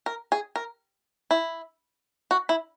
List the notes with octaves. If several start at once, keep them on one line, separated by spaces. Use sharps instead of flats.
A#4
G#4
A#4
E4
F#4
E4